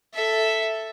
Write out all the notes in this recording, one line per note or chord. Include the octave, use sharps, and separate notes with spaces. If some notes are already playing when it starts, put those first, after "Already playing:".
A4 E5